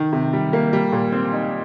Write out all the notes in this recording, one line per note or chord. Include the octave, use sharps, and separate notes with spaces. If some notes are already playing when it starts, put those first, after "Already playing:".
Already playing: D#3
C3
G3
A#3
G3
A#2
C4
D#4